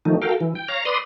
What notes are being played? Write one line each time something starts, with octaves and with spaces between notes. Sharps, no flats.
D#3 F3 A3 D#4
F#4 A4 A#4 F5 G5
E3
G5
C#5 F5 A#5
B4 D5 C6 D#6